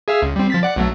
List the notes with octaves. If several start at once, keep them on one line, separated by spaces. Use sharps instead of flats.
G#4 E5 F5
C#2
G3 C4
F3 A6 B6
D5 F#5
B1 F#3 A3